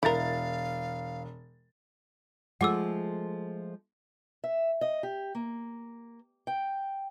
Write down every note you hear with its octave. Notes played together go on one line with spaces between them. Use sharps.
E1 E4 A#4 F5 A6
F3 G#3 A3 F#5 D6 E6
E5
D#5
G4
A#3
G5